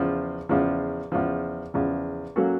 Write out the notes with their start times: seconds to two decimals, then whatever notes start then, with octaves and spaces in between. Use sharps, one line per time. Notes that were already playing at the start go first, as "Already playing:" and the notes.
Already playing: E2 C#3 F3
0.49 E2 C#3 F3
1.12 E2 C#3 F3
1.74 E2 C#3 F3
2.36 F#3 A#3 C#4 F#4 A4